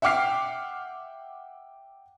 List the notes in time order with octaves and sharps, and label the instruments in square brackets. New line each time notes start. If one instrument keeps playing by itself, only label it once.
[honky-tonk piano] E5 F#5 G5 D6 F6 C7